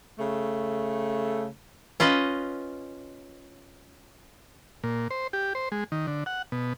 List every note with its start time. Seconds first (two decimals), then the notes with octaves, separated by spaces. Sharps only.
0.18 C#3 A3
2.00 C#4 F4 B4 D#5
4.84 A#2
5.11 C5
5.33 G4
5.55 C5
5.72 G#3
5.92 D#3
6.07 D3
6.26 F#5
6.52 B2